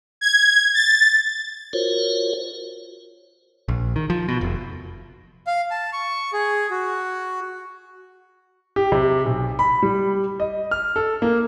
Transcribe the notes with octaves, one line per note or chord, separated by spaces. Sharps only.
G#6
A6
F4 F#4 A#4 C5 C#5
A#1
D#3
F3
B2
F1
F5
A5
C#6
G#4
F#4
G4
C3
B1
B5
G3
D#5
F6
A4
A#3